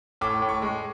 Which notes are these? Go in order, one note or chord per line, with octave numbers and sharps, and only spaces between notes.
A2 D6
A2
C#6
G#3